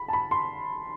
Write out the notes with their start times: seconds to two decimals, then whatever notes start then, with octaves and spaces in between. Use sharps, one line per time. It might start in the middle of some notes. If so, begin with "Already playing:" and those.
Already playing: B5
0.08 A5
0.13 B5
0.31 C6